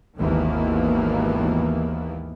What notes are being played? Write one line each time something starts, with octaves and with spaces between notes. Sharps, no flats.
G#1 D#2 D#3 E3 A#3 B3